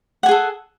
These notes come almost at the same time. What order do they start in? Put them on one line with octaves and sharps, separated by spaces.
F#5 G#5 G#4 A4